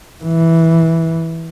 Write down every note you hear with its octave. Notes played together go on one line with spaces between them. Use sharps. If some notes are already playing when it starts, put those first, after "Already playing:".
E3